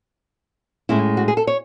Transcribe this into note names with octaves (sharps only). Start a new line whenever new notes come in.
A2 G#3 C#4 E4
F#4
G#4
A4
C#5